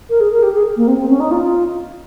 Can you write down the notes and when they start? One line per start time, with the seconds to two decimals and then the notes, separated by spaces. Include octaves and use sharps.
0.09 A#4
0.20 G#4
0.31 A#4
0.42 G4
0.53 G#4
0.76 A#3
0.87 C4
0.97 C4
1.09 C#4
1.20 D#4
1.31 F4